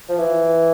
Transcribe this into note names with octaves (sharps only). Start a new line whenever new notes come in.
F3
E3